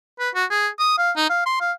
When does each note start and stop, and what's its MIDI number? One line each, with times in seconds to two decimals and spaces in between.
0.20 0.29 71
0.35 0.45 66
0.51 0.68 68
0.79 0.97 87
0.98 1.11 77
1.17 1.27 63
1.30 1.46 77
1.46 1.56 84
1.61 1.72 77